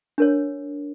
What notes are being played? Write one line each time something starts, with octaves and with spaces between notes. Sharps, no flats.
D4 A#4 C#5